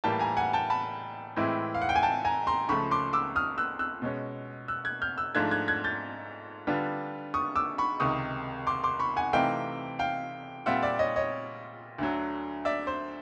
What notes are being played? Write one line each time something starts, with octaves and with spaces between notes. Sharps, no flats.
A2 E3 G3 A#3 G5 A5
G#5 A#5
F#5 G#5
G5 A5
A5 B5
A2 E3 G#3 C4 E4
F5
F#5
G5
G#5
G5 A5
G#5 A#5
A#5 C6
C#2 C#3 F3 A3 B5 C#6
C6 D6
D6 E6
D#6 F6
E6 F#6
E6 F#6
B2 G#3 C#4
E6 F#6
F#6 G#6
F6 G6
E6 F#6
G#2 F3 A3 D4 F4 F#6 G#6
F#6 G#6
F#6 G#6
G6 A6
D3 G3 B3 D4 F4
C#6 D#6
D6 E6
B5 C#6
C#2 C3 D#3 C#6 D#6
C6 D6
C6 D6
B5 C#6
F#5 G#5
C3 E3 A3 C4 D#4 F5 G5
F5 G5
A#2 G3 C4 F4 E5 F#5
D5 E5
C#5 D#5
C#5 D#5
D2 D3 F#3
D5 E5
C5